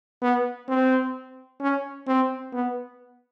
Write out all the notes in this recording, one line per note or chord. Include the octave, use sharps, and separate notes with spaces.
B3
C4
C#4
C4
B3